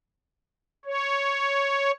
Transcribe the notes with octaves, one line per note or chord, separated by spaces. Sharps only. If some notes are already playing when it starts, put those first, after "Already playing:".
C#5